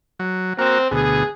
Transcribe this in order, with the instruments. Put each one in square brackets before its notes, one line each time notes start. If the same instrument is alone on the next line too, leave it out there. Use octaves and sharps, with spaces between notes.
[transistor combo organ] F#3
[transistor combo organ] A#3 F#4 [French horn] C4
[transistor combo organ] D2 B2 [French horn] G#4